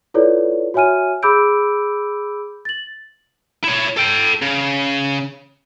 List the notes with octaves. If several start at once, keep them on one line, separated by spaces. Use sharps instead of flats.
E4 F4 A4 B4 C#5 D5
F#4 C#5 E5 G#5 F6 D#7
G#4 B5 D6 E6 G6 D7
A6 F#7
E4 C#5
A4 G5
C#3